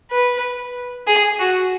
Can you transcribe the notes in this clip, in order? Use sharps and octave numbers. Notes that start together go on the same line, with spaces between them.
B4
G#4
F#4